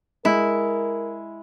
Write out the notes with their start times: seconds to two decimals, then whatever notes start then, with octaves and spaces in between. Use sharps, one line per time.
0.25 G#3 E4 A#4